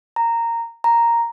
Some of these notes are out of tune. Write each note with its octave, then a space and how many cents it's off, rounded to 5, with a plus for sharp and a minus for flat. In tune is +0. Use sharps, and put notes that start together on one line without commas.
A#5 -10
A#5 +0